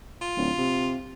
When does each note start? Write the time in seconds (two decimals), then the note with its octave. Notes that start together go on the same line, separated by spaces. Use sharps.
0.22 F4
0.37 D1
0.58 C3